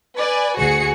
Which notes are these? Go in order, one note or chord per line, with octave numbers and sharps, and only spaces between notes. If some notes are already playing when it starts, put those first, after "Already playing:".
B4 D5 G#5
D2 F#4 G#4 C#7